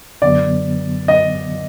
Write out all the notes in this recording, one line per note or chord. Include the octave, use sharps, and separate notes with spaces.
F#2 D3 F#3 B3 D5
D#5